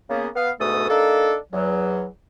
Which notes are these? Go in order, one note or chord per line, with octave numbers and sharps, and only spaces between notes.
C#3 A#3 B3
B3 F5
D2 G#2 B2 A3 A4 D#6
A#3 D4 D#4 A4
E2 F#3